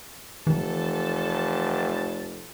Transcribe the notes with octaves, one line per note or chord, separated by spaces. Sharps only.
F1 E3 A4 A5